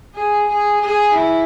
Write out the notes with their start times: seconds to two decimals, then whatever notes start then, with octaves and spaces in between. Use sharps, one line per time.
0.15 G#4
0.49 G#4
0.81 G#4
1.14 E4